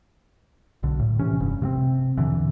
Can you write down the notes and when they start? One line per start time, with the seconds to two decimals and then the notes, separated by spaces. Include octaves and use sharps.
0.83 B1 D3
0.99 A2
1.19 C3 E3 C#4
1.40 F1 G2
1.62 C3 A#3 C4
2.17 E2 B2 D3 E3